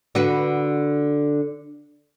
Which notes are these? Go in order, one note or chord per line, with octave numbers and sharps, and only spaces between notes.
D3 F#4 B4